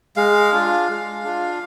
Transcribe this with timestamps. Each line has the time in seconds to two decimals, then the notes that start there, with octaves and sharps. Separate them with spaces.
0.17 G#3 F5
0.52 D4 F4
0.88 G#3
1.24 D4 F4